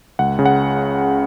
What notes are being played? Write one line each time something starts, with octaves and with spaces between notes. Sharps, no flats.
C#2 F#5
C#3
F#5